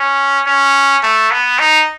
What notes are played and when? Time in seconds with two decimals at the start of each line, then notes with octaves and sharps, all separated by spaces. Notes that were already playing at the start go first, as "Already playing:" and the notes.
Already playing: C#4
0.47 C#4
1.03 A3
1.31 B3
1.59 D#4